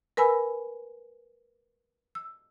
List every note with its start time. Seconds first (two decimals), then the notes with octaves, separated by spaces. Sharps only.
0.17 A#4 B4 G#5 B5 E6
2.15 E6